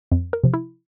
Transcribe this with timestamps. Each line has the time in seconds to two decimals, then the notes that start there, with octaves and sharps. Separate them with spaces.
0.12 F2
0.33 A#4
0.44 C3 F3
0.54 E4